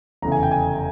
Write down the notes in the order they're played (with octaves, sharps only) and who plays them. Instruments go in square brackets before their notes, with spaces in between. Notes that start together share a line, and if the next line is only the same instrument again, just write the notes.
[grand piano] F1 E2 C#3 A#5
G#5
G5
G#5